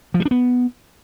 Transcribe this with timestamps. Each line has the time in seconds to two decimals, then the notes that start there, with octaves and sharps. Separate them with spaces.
0.14 F3
0.20 G3
0.25 D4
0.31 B3